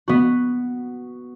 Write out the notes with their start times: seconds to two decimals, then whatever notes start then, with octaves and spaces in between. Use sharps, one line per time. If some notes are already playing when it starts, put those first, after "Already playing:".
0.08 B3 F#4